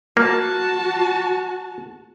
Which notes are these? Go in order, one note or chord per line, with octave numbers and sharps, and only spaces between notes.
A#3 F#4 A5